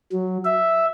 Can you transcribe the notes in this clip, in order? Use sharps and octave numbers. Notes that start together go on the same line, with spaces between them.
F#3
E5